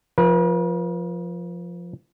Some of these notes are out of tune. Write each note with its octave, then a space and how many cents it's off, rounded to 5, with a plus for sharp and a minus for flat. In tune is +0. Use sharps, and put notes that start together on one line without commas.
F3 +0 B4 -45